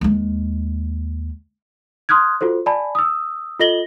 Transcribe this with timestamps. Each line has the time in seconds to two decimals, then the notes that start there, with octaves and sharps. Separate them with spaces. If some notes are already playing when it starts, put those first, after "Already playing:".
0.01 D#2 G#3
2.09 C6 D#6 F6 F#6 G#6
2.41 F4 F#4 A4 C5
2.66 D5 G#5 A5 B5
2.95 D#6 E6
3.59 F4 A4 D#5 A#6 F#7 G7